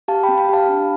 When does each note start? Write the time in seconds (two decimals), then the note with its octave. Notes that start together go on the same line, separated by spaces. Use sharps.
0.08 G4 F5 A5
0.23 C4 G5 B5
0.38 G5 B5
0.49 G4 F5 A5
0.69 D4